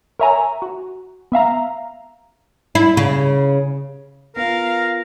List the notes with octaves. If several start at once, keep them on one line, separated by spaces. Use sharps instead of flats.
A#4 C#5 E5 G#5 A#5
F#4
B3 E5 F5 A#5
E4
C#3
B3 F4 A#4 F5